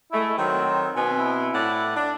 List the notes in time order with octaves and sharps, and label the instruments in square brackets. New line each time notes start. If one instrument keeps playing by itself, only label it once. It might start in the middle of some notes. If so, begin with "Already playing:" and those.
[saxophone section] G#3 A3 [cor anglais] E4
[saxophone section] D#3 F#3 [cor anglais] C4
[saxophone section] B2 B3 C4 [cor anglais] G#5
[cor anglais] E4
[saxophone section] A2 D5 F#5
D4